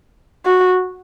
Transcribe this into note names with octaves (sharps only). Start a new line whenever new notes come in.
F#4